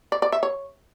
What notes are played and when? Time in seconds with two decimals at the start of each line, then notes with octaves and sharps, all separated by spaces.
0.12 D5
0.22 D5
0.32 E5
0.43 C#5